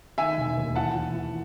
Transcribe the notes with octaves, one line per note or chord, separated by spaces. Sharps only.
D#3 E5 G#5
E1
D#2
E3 F#5 A5
E3
E3